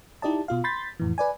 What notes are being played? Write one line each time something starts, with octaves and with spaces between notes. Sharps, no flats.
D#4 E4 G4 D5 D#5 A5
B2 F4 F5
B5 C6 G6 A6 B6
F2 A2 E3
B4 D5 G#5